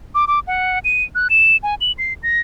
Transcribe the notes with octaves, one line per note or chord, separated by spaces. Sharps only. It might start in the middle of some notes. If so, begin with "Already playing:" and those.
D6
D6
F#5
D#7
F#6
E7
G#5
F#7
C7
A#6